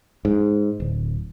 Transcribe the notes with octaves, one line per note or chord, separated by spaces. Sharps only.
G#2
D1